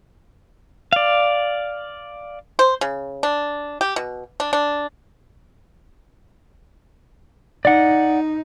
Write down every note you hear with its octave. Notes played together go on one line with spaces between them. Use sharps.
D5 F5
C5
C#3
D4
G4
B2
D4
D4
D#4 D5 F#5